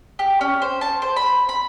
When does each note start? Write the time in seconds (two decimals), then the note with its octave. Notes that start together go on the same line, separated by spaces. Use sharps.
0.19 G4
0.41 C#4
0.62 C5
0.81 A5
1.02 C5
1.16 B5
1.49 B5